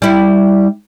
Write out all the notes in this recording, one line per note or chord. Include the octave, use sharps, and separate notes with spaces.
G3 E4